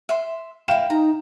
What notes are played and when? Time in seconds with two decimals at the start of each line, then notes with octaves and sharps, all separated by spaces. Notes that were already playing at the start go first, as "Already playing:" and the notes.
0.09 E5 C6
0.68 E4 A#4 F5 G5 E7
0.90 D#4 A#5